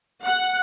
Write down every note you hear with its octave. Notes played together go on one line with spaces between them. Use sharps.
F#5